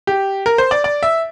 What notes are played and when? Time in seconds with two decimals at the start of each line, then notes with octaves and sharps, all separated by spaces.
0.07 G4
0.46 A#4
0.58 C5
0.71 D5
0.84 D5
1.03 E5